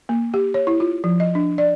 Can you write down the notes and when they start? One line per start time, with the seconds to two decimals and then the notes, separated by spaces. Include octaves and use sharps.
0.09 A#3
0.34 G4
0.54 C#5
0.67 E4
0.80 F4
1.04 F3
1.20 D#5
1.35 D4
1.58 D5